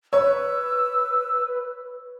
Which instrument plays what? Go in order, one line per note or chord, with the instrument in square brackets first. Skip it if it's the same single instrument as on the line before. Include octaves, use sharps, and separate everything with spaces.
[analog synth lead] B4 [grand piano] C#5 [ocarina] E6